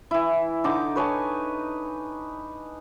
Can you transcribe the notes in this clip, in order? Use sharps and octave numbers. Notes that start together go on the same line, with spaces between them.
E3 E4
D3 D#4 D6
B4 C#5 G#5 A5